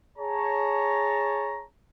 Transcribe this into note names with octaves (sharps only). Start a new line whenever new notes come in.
G#4 C#5 A5 A#5